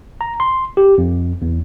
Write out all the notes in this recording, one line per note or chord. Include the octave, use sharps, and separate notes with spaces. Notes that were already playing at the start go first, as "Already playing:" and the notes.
A#5
C6
G4
F2
E2